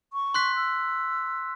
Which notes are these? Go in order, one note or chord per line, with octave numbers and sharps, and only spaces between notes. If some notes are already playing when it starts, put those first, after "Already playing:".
C#6
C6 F#6 B6
E6